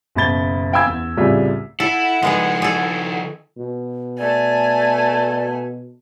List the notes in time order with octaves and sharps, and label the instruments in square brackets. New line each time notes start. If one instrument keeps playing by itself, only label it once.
[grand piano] F#1 B2 B5 A6 G7
F5 G5 G#5 B5 E6 G#6
E2
C2 A2 C#3 G3 F4 B6
[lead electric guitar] E4 [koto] A4 [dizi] F#5
[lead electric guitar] D#3 F3 [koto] G#3 B3 G#4
[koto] G#4 A4
[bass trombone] B2
[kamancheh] A3 G#5 [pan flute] D5